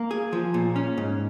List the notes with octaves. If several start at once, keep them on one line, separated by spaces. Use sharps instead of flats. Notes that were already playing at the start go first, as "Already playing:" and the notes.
Already playing: A#3
G#4
F3
A#2
C#4
G#2